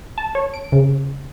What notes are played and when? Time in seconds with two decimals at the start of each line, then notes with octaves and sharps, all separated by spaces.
0.18 A5
0.35 C#5
0.54 D7
0.72 C#3